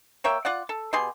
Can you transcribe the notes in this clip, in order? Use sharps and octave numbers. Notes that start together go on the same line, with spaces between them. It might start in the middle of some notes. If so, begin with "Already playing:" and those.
A#3 C#5 E5 G5
F4 D5 F#5
A4
B2 G4 G#4 C6